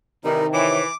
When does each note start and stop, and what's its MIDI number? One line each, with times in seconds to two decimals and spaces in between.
0.25 0.44 45
0.25 0.81 48
0.25 0.81 51
0.25 0.44 52
0.25 0.44 55
0.25 0.46 63
0.25 0.46 70
0.54 0.88 52
0.54 0.81 73
0.54 0.95 86